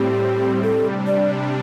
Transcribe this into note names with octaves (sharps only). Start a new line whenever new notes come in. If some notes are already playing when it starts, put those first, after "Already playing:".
Already playing: A2 G3 C4 G4
C3 G3 D4 A4
D5